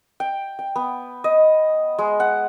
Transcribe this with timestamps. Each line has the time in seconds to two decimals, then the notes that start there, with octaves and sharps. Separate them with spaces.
0.20 G5
0.59 G5
0.76 B3
1.24 D#5
1.99 G#3
2.20 F#5